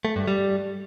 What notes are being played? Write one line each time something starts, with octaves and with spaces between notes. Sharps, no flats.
A3
G2
G3